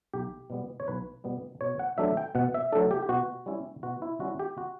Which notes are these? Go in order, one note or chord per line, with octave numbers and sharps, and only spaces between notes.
B1 G4
B2 G3 B3
C#5
B1 B4
B2 G3 B3
B2 C#5
F#5
F#3 A3 D4 E5
G5
B2 F#5
E5
F#3 A3 D4 A4
G4
G4
B2 F#4
G3 C#4 E4
B2 F#4
E4
G3 C#4 E4 F#4
G4
F#4